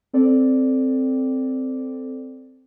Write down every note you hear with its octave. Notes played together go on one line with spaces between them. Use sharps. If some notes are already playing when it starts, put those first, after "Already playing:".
C4 A4 D5